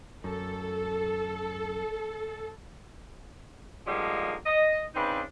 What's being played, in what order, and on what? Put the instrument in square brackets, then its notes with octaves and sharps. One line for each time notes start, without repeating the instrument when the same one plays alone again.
[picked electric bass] F#2 [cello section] A4
[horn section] D3 F3 G3 G#3 A#3 D#4
D#5
C#3 C4 D4 D#4 B4